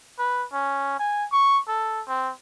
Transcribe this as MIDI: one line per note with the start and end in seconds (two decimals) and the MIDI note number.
0.19 0.45 71
0.53 0.96 61
0.99 1.25 80
1.32 1.60 85
1.68 2.02 69
2.08 2.32 60